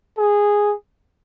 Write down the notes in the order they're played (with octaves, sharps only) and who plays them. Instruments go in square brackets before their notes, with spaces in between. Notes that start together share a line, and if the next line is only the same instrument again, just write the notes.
[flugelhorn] G#4